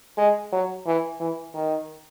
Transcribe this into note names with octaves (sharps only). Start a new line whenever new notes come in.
G#3
F#3
E3
E3
D#3